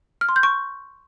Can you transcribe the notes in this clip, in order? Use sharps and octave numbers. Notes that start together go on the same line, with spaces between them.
F6
C6
G6
C#6